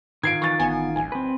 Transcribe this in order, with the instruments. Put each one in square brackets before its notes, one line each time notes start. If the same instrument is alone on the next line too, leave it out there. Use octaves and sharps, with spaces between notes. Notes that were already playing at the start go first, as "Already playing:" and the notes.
[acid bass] G#2 [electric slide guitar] D#3 F4 [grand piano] G#6 C7 D7
[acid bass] E3 [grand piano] C#6 A6
[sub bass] A1 [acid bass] B3 [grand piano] G#5
[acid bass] D1 [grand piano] G#5
[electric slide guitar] C4 B4